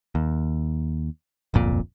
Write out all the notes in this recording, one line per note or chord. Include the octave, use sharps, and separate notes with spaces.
D#2
D1 G1 F2 A#2